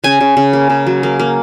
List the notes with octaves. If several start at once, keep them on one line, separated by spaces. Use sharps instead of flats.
C#3 G#5
C#3
C#3
A#3
C#3
F#3
A#3
A#3